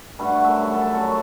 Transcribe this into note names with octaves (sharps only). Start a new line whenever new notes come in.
G2 A3 F#4 B5
F#2 E5
A4
F#2 C#6